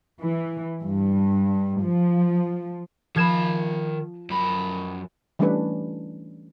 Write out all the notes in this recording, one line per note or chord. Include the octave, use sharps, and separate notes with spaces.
E3
G2
F3
D#3 F3 B5 G#6 E7
F#2 B5
E3 G3 A3 C#4 D4 B4